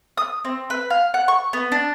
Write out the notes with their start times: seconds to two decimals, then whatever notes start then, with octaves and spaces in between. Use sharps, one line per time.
0.17 D#6
0.45 C4
0.70 B4
0.90 F5
1.14 F#5
1.28 C#6
1.53 B3
1.72 D4